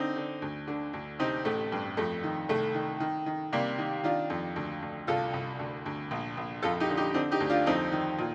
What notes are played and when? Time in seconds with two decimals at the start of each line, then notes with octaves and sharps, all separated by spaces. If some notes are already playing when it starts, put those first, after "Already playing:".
Already playing: D3 C4 D#4
0.16 D3
0.42 D2
0.68 D3
0.93 D2
1.19 C3 C4 D#4
1.45 A1 A3
1.72 G2
1.97 F2 A3
2.23 D#3
2.49 C2 A3
2.74 D#3
3.00 D#3
3.26 D#3
3.52 C3 G3 A#3
3.78 D#3
4.04 D#3 D4 F4
4.30 F2
4.56 D2
4.82 D2
5.07 C2 F4 A4
5.33 C2
5.59 D2
5.86 D2
6.11 A#1
6.37 A#1
6.62 F2 F4 A4
6.80 D#4 G4
6.89 D3
6.97 D#4 G4
7.14 D3 C4 D#4
7.32 D#4 G4
7.40 D2
7.49 D4 F4
7.66 F2 C4 D#4
7.92 D#3
8.18 A#2